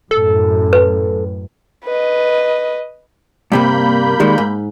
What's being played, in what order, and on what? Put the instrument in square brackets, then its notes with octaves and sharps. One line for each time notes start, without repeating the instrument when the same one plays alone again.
[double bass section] F#2 A2 [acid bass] A4
[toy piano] B4
[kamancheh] B4 D#5
[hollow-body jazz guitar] G2 C3 G3 [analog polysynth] A#3 B5 G6
[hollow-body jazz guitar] D#3 G3 G#3
G#2